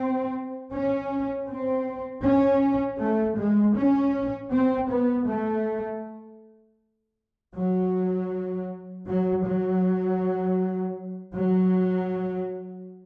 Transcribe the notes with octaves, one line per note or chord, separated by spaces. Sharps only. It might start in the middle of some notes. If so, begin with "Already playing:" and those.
Already playing: C4
C#4
C4
C#4
A3
G#3
C#4
C4
B3
A3
F#3
F#3
F#3
F#3